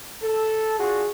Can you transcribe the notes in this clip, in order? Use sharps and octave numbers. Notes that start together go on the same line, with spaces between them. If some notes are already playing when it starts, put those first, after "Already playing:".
A4
D4 F4 F#4 G#4